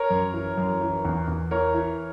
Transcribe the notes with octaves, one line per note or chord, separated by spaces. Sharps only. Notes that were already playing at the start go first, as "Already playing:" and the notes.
Already playing: A#4 C#5
F#2
E3
F#2
E3
E2
E2
E3 A#4 C#5
E3